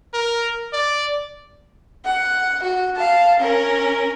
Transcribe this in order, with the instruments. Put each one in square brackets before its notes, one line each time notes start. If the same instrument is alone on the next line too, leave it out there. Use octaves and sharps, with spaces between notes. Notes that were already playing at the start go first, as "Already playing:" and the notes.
[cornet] A#4
D5
[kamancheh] F#5
F#4
F5 A5
C#4 A#4